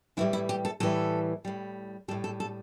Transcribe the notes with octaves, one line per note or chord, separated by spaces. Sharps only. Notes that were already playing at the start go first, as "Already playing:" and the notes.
A2 E3 G3 E4
E4
G4
A4
A2 E3 G3 A4
A2 G3
A2 G3 A4
A4
A4